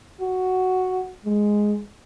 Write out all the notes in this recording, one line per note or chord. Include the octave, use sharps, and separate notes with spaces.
F#4
G#3